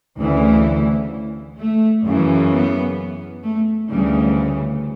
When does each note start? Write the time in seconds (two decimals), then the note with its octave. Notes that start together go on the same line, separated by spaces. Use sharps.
0.19 D2 C#3 E3
1.58 A3
2.05 F#2 C#3 E3
2.51 B3
3.43 A3
3.90 D2 C#3 E3 G3